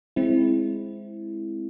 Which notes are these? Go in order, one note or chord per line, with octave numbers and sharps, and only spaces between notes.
G#3 C4 E4